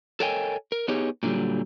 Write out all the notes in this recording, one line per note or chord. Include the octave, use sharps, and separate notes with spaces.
A4 A#4 C#5 D#5 G5 G#5
A#4
B3 D#4 G4 G#4 C#5
A#2 D3 D#3 F#3 G3